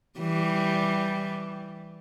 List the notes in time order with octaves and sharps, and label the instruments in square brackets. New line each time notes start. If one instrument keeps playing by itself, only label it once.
[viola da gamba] E3 G3